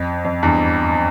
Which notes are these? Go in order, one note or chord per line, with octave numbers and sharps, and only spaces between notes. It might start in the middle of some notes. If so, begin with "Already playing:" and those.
Already playing: F2
F2
E2 G2